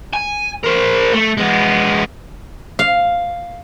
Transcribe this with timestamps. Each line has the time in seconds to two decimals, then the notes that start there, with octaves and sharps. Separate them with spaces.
0.13 G#5
0.64 A#4 C5
1.13 A3
1.37 G#3 B3
2.79 F5